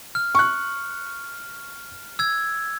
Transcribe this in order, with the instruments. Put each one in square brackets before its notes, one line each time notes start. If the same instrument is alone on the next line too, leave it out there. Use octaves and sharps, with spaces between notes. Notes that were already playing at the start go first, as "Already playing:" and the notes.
[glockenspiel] F6
[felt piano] C#6 F#6
[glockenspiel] E6 G#6